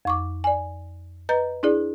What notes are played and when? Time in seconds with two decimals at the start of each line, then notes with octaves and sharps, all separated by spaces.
0.05 F2 C#6 D6
0.44 D5 G#5
1.29 B4 D#5 A#5 G6
1.63 D4 E4 G#4 D5